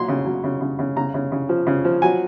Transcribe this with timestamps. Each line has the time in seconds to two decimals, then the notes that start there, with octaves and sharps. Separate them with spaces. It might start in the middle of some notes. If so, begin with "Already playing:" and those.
Already playing: A#2 F#3 C6
0.08 C#3
0.26 F#3
0.44 C#3
0.61 C#3
0.79 C#3
0.96 C#3 A#5
1.14 C#3
1.32 C#3
1.49 F3
1.67 C#3
1.85 F3
2.02 F#3 G#5